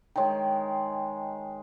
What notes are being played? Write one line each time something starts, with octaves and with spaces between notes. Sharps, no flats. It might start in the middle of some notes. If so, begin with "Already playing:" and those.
D#3 G#3 C#5 G5